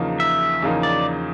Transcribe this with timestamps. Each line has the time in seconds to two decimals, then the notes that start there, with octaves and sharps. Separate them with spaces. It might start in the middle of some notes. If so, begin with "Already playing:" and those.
Already playing: E2 C#3 F3 A#3 D#4
0.20 E5
0.62 E2 C#3 F3 A#3 D#4
0.83 D5